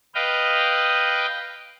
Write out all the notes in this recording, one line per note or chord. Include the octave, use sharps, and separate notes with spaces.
B4 D#5 F5 G5